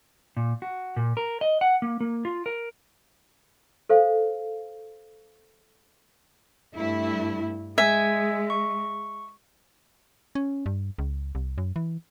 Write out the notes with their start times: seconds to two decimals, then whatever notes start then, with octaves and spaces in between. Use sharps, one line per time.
0.37 A#2
0.62 F#4
0.96 A#2
1.17 A#4
1.41 D#5
1.61 F#5
1.82 A#3
2.00 A#3
2.25 F4
2.46 A#4
3.89 A4 C5 F5
6.76 G2 A3 E4
7.78 G#3 E5 G#5 E6 G#6
8.50 C#6
10.35 C#4
10.66 G2
10.98 C#2
11.35 C2
11.58 F#2
11.76 E3